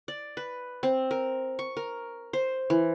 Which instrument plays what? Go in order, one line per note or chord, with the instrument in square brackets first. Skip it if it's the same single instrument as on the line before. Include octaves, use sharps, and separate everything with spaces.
[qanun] D5
B4
C4
A#4
C#6
A#4
C5
E3